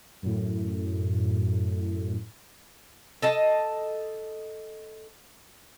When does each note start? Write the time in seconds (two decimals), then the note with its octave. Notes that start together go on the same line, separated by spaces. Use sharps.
0.22 F#2 A2
3.22 A4 D#5 A5